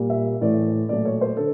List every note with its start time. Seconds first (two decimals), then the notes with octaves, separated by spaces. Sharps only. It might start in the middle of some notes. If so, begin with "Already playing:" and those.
Already playing: A#2 G3 A#3
0.10 E5
0.41 A2 E3 A3 D5
0.89 A#2 F#3 A3 D5
1.05 C#5
1.21 C5
1.37 D3 A4